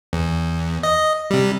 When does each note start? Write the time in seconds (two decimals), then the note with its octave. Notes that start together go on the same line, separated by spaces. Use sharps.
0.13 E2
0.83 D#5
1.30 C3 G3